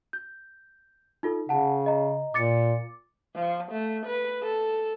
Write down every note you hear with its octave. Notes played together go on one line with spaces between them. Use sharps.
G6
D#4 F4 A4
C#3 F#5 A5
D#5 A#5
A#2 D6 A6 C#7
F3
A3
B4
A4